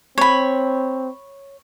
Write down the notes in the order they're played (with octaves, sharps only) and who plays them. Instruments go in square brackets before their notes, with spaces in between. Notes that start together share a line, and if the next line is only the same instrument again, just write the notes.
[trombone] C4 [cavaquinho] C#5 B5